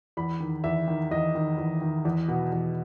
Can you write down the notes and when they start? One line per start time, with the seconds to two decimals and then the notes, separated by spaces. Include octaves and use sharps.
0.17 E2 B5
0.40 D#3
0.64 E2 E5
0.88 D#3
1.11 E2 D#5
1.35 D#3
1.58 E2
1.81 D#3
2.05 E2
2.28 B2
2.52 E2